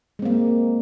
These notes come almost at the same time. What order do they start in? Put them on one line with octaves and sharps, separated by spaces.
G#3 C4 A#3